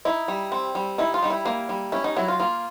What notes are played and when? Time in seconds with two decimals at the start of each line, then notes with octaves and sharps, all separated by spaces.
0.05 D#4 E4
0.28 G3
0.52 C4
0.75 G3
0.98 D#4 E4
1.14 F4
1.23 G3 D#4
1.30 E4
1.46 A#3
1.69 G3
1.92 C#4 E4
2.04 D#4
2.16 F#3 E4
2.28 F4
2.40 A#3 F4